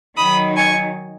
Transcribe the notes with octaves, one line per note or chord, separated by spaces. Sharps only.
D#3 F#3 D#4 B5 D#6
G#5 C#6